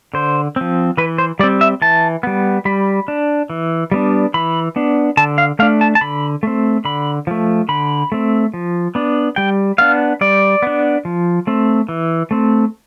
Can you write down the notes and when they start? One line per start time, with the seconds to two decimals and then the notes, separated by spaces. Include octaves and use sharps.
0.14 D3 C5
0.56 F3 C4
0.97 E3 B4
1.18 C5
1.39 G3 D5
1.43 C4
1.61 E5
1.82 E3 A5
2.23 G3 B3
2.65 G3 B5
3.08 D4
3.50 E3
3.91 G3 B3 D4
4.34 E3 B5
4.76 B3 D4
5.17 D3 A5
5.38 F5
5.59 A3 D4 F5
5.81 A5
5.95 A5
6.01 D3 B5
6.43 A3 C4
6.85 D3 B5
7.27 F3 A3
7.69 D3 B5
8.12 A3 C4
8.54 F3
8.95 B3 D4
9.36 G3 G5
9.78 B3 D4 F5
10.21 G3 D5
10.62 B3 D4
11.05 F3
11.47 A3 C4
11.89 E3
12.31 A3 C4